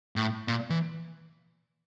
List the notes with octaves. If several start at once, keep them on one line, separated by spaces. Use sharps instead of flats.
A2
A#2
E3